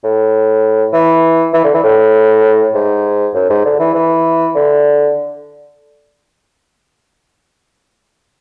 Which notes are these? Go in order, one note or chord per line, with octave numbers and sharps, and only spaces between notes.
A2
E3
E3
D3
E3
A2
G#2
F#2
G#2
D3
E3
E3
D3